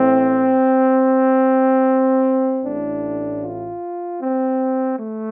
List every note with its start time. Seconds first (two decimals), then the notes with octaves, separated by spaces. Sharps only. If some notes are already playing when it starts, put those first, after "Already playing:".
Already playing: A1 A2 C4
2.64 A1 A2 D4
3.43 F4
4.22 C4
5.00 A3